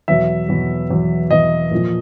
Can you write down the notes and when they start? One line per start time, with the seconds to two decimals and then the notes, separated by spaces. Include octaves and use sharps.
0.08 E2 B2 F#3 E5
0.49 E2 B2 F#3
0.90 E2 B2 F#3
1.31 E2 B2 F#3 D#5
1.71 A#2 F3